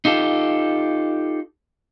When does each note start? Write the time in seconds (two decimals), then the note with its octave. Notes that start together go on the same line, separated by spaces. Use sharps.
0.05 D#4 F4 G4 A4